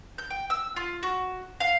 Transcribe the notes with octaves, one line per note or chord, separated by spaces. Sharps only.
G6
G5
E6
F4
F#4
F5